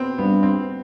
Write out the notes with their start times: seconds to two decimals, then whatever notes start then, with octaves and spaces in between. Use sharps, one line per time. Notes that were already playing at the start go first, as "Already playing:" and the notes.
Already playing: B3 C4
0.18 G2 B3
0.43 C4